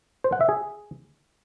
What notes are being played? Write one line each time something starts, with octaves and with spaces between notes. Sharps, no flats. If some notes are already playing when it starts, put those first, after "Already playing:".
C5
F#5
E5
G#4